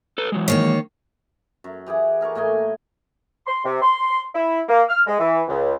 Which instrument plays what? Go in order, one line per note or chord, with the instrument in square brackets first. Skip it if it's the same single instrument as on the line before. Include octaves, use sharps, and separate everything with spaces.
[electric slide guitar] A4 B4
E3 F#3 G#3
[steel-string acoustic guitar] D#3 A#3 C#5
[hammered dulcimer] F#2
E3 G4 G#4 F#5
G#4 A#4 D5 C#6
A2 A#3 D#5 G#5
[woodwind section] C6
C3
C6
E4
A#3
F6
G#3
E3
C#2